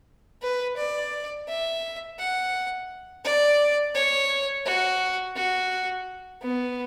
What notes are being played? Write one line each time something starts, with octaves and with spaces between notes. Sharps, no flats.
B4
D5
E5
F#5
D5
C#5
F#4
F#4
B3